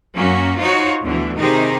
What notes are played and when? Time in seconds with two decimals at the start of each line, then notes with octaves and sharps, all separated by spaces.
0.16 F#2 F#3 A#3 C#4 F#4
0.58 D#4 F4 F#4 C5 C#5
1.02 D2 B2 D3 E3
1.37 C3 D#3 D#4 G4 G#4 C5